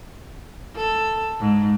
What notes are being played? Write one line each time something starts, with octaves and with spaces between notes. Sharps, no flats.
A4
G#2